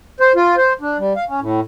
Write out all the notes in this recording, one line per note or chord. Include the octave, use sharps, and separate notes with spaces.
C5
F4
C5
D4
G3
F5
C#4
A2